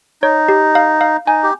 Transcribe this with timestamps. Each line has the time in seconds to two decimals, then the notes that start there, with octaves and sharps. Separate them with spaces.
0.22 D#4 C#5
0.49 G4
0.75 F5
1.01 F5
1.27 D#4 G#5
1.43 G4